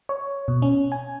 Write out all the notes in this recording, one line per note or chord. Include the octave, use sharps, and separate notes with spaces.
C#5
B2
C#4
G#5